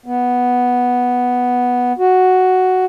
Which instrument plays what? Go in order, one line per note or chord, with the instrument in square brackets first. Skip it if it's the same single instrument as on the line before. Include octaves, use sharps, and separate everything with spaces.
[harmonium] B3
F#4